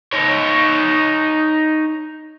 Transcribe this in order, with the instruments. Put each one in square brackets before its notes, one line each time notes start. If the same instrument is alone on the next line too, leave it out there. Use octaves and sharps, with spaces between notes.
[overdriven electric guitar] D#4 C#5